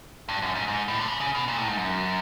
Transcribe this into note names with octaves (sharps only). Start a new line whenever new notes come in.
G2
F#2
G#2
G#2
A2
D3
C#3
C#3
B2
A#2
A2
G#2
F#2